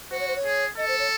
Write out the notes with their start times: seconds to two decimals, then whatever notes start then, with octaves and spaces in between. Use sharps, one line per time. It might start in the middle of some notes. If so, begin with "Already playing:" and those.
0.11 F#4 C5
0.20 C#5
0.28 C5
0.36 C#5
0.44 G#4
0.77 A4 D#5
0.88 C5
0.99 C#5